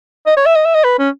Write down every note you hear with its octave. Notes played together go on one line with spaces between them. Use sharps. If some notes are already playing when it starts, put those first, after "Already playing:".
D#5
C#5
E5
D#5
E5
D#5
B4
C#4